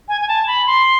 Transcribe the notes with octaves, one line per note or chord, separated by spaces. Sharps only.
G#5
G#5
A5
B5
C6